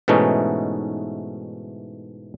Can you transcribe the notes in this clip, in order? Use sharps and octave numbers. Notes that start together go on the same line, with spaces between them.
G#2 B2 E3 A3 C#4 D#4